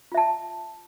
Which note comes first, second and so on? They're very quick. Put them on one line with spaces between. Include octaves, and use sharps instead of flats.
F4 E5 A5